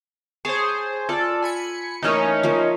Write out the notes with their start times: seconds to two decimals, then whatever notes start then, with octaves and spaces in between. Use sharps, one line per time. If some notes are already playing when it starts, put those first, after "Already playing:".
0.45 G#4 C5 C#5 A5
1.09 F4 A4 D5
1.42 G#5 B5 C#7
2.03 E3 A3 A#3 C#4 D#4
2.43 F3 A#3